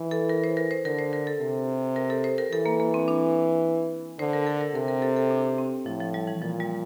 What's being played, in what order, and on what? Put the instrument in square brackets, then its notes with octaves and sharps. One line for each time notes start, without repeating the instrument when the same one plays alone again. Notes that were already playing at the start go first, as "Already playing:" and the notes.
Already playing: [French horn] E3
[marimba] A4
A#4
C5
A#4
C5
[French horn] D3 [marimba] A#4
[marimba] C5
A#4
A4
[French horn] C3
[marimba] A#4
A4
C5
A#4
[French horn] E3 [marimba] A4
[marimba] A#3
A#3
C4
D4
[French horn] D3 [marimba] C5
[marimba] A#4
A4
A#4
[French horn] C3 [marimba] A#4
[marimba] A#4
A4
A4
D4
C4
[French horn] A2 [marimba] F3
[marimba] F3
G3
E3
[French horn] A#2 [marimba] F3
[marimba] G3